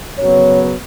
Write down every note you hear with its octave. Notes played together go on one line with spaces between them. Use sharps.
F#2 C#3 F#3 B3 C#5